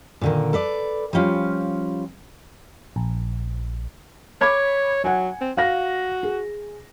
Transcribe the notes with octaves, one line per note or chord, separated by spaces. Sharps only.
A#2 D3 D#3
A4 B4 D5
F3 G3 C#4 F4
A#1
C#5 B5 D6 G#6
F#3 F#5 G#5
C4
F#4 F5 A#6
G#4